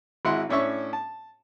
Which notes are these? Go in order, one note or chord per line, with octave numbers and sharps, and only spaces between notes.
G#1 G#3 E4 F#5 C6
A2 C#4 D4 E5 C#6
A5